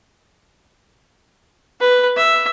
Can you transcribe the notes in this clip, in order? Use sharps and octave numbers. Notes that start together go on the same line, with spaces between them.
B4
E5